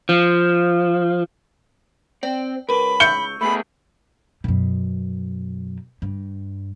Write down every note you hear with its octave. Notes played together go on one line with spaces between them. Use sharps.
F3
C4 D5 G5
C#2 A#4 B4 B5
C#6 E6 G6 C#7 G7
A3 B3 G#4 B5
F#2 B2
G2